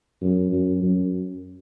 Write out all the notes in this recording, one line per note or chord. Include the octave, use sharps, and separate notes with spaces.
F#2
F#2
F#2